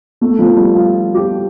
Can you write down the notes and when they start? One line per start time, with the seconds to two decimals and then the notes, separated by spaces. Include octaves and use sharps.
0.21 A3
0.39 F3
0.56 G3
0.74 F4
1.14 G4